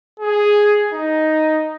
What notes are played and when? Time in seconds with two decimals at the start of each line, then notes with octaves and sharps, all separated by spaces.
0.20 G#4
0.93 D#4